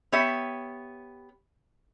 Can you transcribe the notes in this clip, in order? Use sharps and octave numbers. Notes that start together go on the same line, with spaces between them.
B3 G4 C#5 E5